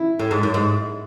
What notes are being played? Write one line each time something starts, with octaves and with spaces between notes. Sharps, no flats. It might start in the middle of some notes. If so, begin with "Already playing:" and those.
Already playing: E4
A2
G#2
F#2
G#2